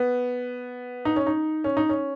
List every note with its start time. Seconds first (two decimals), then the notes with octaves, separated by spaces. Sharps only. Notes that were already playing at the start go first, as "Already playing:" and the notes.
Already playing: B3
1.05 D#4
1.16 C#4
1.27 D#4
1.64 C#4
1.77 D#4
1.89 C#4